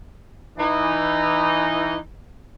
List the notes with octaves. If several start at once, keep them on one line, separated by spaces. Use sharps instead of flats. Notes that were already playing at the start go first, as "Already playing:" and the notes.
E3 D#4